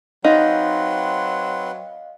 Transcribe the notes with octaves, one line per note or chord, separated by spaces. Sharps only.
F#3 C4 D#4 B4 D#5 F5 C6